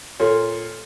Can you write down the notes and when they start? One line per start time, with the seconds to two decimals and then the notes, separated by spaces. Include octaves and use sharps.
0.20 A#2 A4 C#5